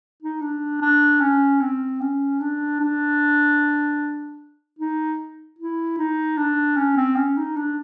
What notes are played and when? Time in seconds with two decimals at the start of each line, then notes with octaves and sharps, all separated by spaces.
0.22 D#4
0.42 D4
0.81 D4
1.21 C#4
1.61 C4
2.01 C#4
2.40 D4
2.80 D4
4.79 D#4
5.59 E4
5.98 D#4
6.38 D4
6.77 C#4
6.97 C4
7.16 C#4
7.37 D#4
7.56 D4